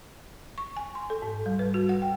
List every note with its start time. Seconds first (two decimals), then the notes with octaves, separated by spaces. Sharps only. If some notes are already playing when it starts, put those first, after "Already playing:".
0.58 C#6
0.77 G#5
0.95 C6
1.10 A4
1.22 G#2
1.46 G3
1.59 B4
1.74 F#4
1.89 F#5
2.02 G5